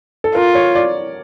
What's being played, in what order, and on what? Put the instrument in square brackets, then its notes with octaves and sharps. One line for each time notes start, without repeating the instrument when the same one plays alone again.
[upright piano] A4
[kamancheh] F4 [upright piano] A#4
[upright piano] C#5
D5